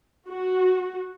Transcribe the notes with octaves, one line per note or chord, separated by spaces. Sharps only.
F#4